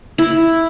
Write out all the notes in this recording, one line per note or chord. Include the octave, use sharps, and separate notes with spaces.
E4